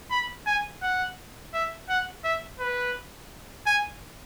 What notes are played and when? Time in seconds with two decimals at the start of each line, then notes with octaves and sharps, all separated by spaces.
0.11 B5
0.46 G#5
0.82 F#5
1.54 E5
1.89 F#5
2.24 E5
2.60 B4
3.67 G#5